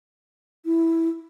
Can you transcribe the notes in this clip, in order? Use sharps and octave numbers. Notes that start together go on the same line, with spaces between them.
E4